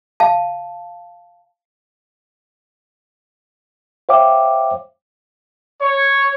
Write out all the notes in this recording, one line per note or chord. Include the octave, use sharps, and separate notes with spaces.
F5 A5
C5 C#5 E5 F5 G5 D6
C#5